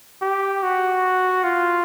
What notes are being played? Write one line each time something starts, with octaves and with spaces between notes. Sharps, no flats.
G4
F#4
F4